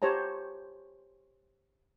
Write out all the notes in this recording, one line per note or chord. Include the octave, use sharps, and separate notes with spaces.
G4 C5 C#5 A5 A#5